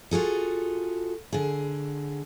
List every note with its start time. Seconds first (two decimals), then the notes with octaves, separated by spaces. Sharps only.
0.11 F4 F#4 G#4 A4
1.33 D3 G#4